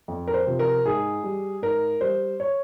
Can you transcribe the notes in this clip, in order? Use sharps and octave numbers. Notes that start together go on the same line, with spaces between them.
F2
A#4
C5
C3 F3
A#4
G#2 G#4
G3
G#2 A#4
G3 C5
C#5